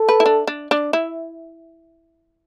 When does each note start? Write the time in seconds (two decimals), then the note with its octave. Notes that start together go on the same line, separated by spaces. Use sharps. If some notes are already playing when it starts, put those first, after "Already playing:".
Already playing: A4
0.09 B4
0.20 E4
0.26 D4
0.47 D4
0.71 D4
0.93 E4